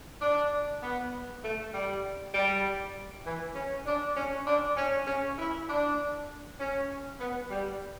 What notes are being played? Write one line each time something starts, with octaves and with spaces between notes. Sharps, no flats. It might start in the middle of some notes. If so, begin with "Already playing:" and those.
D4
B3
A3
G3
G3
E3
C#4
D4
C#4
D4
C#4
C#4
E4
D4
C#4
B3
G3